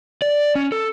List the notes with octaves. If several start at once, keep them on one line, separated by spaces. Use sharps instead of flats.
D5
C#4
A4